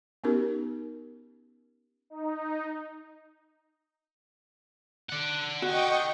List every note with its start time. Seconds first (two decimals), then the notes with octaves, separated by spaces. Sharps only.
0.24 B3 C#4 D#4 F#4 G4 A#4
2.10 D#4
5.09 D5 F#5
5.62 F#4 D#5 G5 C#6